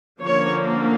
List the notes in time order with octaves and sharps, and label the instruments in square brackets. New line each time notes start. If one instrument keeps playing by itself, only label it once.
[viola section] D3 F3 A#3 C#4 C#5